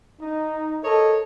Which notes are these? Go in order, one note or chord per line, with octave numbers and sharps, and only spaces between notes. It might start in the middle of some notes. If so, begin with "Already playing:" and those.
D#4
A4 A#4 C#5 D#5